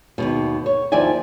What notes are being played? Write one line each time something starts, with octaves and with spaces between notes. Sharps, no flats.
D#2 G#2 B2
C#5
D#2 F3 E4 D5 G#5